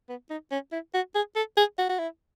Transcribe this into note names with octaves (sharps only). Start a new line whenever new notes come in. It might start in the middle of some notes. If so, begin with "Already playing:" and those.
B3
D#4
C#4
E4
F#4
G#4
A4
G#4
F#4
F#4
E4